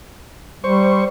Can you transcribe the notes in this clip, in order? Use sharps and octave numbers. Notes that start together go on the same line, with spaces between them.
G3 C5 C#6